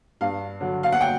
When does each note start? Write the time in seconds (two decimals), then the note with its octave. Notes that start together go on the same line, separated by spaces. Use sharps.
0.21 G2 F5
0.61 D3 F#3
0.83 F5
0.92 F#5
1.01 G5